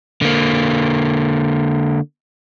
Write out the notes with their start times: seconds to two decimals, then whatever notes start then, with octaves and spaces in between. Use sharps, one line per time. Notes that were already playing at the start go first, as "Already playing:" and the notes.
0.22 D3 A#3